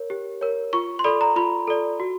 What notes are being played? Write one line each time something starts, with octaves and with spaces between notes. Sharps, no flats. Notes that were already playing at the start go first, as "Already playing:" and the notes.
Already playing: A#4 C#5
G4
A#4 C#5
F4 C#6
C6
A4 D5 B5
A#5
F4 B5
A4 D5
F#4